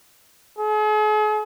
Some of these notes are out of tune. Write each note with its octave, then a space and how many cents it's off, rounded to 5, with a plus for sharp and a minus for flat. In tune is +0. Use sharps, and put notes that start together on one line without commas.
G#4 +45